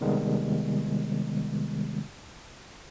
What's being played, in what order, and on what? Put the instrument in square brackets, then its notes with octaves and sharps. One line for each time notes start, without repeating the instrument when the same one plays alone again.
[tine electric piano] C3 D#3 G3 G#3 B3